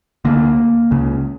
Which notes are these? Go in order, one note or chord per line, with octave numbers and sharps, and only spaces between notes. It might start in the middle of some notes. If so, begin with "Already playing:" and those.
D2 D3 A#3
C#2 C#3